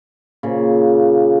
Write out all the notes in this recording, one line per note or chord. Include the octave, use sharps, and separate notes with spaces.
A#2 C#3